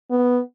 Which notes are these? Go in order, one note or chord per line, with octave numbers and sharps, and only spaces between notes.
B3